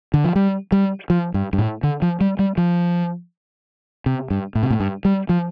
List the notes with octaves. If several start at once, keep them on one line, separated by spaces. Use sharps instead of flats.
D3
F3
G3
G3
F3
G2
G2
A2
D3
F3
G3
G3
F3
C3
G2
A2
C3
A2
G2
G3
F3